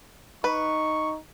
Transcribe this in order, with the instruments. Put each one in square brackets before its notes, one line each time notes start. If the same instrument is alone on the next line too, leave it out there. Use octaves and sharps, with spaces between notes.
[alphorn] D#4 [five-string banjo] B4 [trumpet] C#6